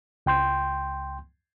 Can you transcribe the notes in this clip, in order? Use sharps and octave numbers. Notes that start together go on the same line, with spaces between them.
C#2 G5 C6 G6